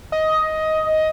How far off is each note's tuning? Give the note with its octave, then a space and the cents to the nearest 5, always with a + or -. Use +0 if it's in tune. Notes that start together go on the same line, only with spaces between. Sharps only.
D#5 +10